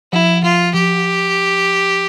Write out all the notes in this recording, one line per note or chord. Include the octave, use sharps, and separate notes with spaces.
F3 E4
F3 F4
F3 G4